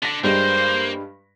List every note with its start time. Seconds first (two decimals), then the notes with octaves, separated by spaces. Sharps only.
0.03 D3 A#6 B6
0.24 G2 G3 G#3 A#3 C5